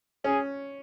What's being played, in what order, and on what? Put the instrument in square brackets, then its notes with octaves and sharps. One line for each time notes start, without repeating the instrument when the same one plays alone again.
[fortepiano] C#4 [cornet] G#4